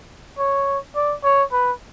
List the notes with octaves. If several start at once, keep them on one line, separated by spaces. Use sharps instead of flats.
C#5
D5
C#5
B4